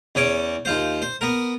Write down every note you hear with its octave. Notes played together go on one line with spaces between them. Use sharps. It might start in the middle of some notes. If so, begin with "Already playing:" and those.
E2 C#4 C#5 D6
D#2 F4 C5
C5
B3 A#4